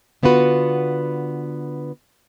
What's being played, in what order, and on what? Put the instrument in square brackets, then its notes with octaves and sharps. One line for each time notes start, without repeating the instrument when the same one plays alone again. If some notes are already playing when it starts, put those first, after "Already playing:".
[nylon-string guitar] D3 B3 F4 F#4 B4